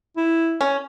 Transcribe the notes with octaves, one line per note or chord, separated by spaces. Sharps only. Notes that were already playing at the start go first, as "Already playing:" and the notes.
E4
C#4